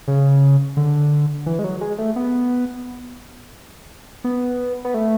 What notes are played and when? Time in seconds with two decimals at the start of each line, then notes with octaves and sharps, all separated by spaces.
0.08 C#3
0.77 D3
1.46 E3
1.59 G#3
1.64 F#3
1.81 G#3
1.98 A3
2.16 B3
4.24 B3
4.85 B3
4.94 A3